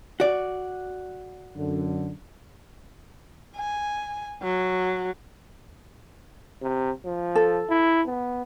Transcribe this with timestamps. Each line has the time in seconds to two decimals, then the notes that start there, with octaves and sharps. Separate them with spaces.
0.20 F#4 D5
1.55 F#2 D3
3.56 G#5
4.43 F#3
6.62 C3
7.05 F3
7.35 A4
7.70 E4
8.07 B3